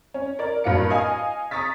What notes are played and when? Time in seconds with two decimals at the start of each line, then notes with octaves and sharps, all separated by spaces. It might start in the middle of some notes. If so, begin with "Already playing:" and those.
0.14 C#4
0.39 A#4 D5
0.64 G2 F#3 A#3 F5 C#7
0.90 D#5 F5 G#5
1.51 A#5 C#6 D#6 A6 B6